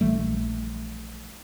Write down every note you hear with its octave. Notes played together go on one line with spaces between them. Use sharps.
A#1 E3 G3 A3